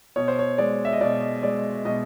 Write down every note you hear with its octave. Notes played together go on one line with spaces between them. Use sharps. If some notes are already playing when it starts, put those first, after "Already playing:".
B2 C#5
C5
C#5
G#3 D5
E5
D#5
B2 D5
G#3 D5
B2 D#5